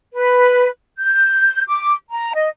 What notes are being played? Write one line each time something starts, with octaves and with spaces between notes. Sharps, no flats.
B4
G6
D6
A#5
D#5